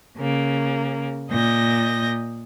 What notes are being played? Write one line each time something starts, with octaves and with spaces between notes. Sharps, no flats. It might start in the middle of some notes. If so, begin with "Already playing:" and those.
C#3 A#3
A#2 D#5 G6 A#6